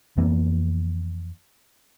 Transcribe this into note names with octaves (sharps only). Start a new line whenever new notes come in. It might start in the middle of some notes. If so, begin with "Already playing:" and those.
F2 E3 A#3 B3